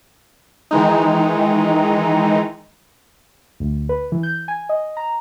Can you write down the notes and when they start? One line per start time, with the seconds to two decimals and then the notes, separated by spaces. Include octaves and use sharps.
0.71 D#3 E3 G#3 D#4
3.60 D2
3.89 B4
4.12 E3
4.23 G6
4.48 G#5
4.69 D#5
4.97 A#5